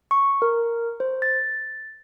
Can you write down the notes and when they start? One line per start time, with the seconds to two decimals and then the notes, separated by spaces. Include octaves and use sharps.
0.11 C#6
0.42 A#4
1.00 C5
1.22 A6